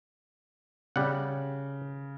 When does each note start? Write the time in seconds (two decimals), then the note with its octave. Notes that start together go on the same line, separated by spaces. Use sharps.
0.96 C#3 G3 F#5